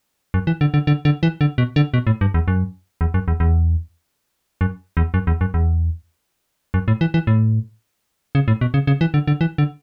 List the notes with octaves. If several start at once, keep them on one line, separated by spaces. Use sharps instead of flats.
F#2
E3
D3
D3
D3
D3
E3
D3
B2
D3
B2
A2
G2
E2
F#2
E2
F#2
E2
E2
F#2
E2
F#2
E2
F#2
E2
F#2
A2
E3
E3
A2
C#3
A2
B2
C#3
C#3
E3
D3
D3
E3
D3